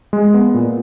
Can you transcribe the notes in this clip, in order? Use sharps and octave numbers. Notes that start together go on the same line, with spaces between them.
G#3
B3
A#2